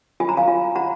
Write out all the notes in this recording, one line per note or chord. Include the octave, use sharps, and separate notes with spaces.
F4 G#5
A#5
F5 G#5
F4
F4 F#5 A#5